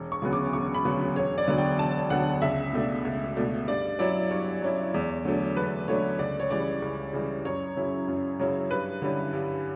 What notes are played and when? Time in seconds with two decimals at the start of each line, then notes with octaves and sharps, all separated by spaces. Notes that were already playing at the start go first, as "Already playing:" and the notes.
Already playing: E1
0.12 C#6
0.22 D2 C#3 F#3 B3
0.33 D6
0.53 E1 C#6
0.74 B5
0.85 D2 C#3 F#3 B3
1.16 E1 C#5
1.38 D5
1.48 D2 D3 F#3 B3
1.58 G5
1.79 E1 A5
2.10 D2 D3 F#3 B3 F#5
2.42 C#2 E5
2.73 B2 A3 D4
3.05 C#2
3.36 B2 A3 D4
3.68 G2 D5
3.99 F#3 C#4 E4 D5
4.31 G2 C#5
4.62 F#3 C#4 E4
4.94 E2
5.25 D3 F#3 A3 D4
5.56 E2 B4
5.88 D3 F#3 A3 D4 C#5
6.19 C#2 D5
6.40 C#5
6.50 C#3 E3 G3 D5
6.82 C#2
7.13 C#3 E3 G3
7.45 F#2 C#5
7.76 C#3 F#3 C#4 E4
8.08 F#2
8.39 C#3 F#3 C#4 E4
8.71 G2 B4
9.02 D3 G3 C#4 E4
9.33 G2